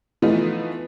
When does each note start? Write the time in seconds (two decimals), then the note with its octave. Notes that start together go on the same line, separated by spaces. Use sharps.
0.22 E3 F3 A3 B3 D#4